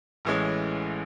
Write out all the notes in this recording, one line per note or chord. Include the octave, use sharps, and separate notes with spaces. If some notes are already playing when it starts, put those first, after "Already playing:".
A1 A2 E3 G#3 C#4